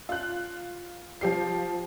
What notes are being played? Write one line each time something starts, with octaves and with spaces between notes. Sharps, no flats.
F4 F#6
F3 G4 C7